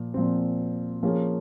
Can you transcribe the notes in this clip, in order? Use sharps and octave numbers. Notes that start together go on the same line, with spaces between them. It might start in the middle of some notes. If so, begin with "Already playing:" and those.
Already playing: A#2 F3
A#2 F3 C4
F3 A#3 C#4 G#4